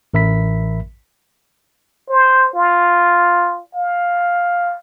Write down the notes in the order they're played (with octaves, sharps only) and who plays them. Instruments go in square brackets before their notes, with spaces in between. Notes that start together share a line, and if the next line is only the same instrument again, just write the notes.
[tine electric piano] A1 A#4 E5 B5 B6
[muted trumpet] C5
F4
F5